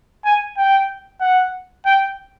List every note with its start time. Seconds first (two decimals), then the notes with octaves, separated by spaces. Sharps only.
0.25 G#5
0.57 G5
1.21 F#5
1.85 G5